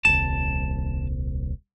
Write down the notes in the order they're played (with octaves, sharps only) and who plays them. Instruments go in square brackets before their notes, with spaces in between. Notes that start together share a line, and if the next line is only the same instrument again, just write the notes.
[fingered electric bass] D#1 C2 [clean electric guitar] A5